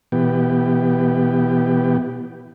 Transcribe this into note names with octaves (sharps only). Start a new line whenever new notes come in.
B2 E3 B3 G4